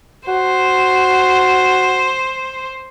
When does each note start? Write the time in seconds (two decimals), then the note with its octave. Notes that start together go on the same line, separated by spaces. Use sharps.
0.28 F#4 C5